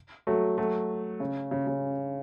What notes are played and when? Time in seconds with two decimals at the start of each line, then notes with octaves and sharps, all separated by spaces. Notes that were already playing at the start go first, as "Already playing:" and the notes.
0.27 F#3 A3
0.58 F#3 A3
1.20 C#3
1.51 C#3
1.67 C#3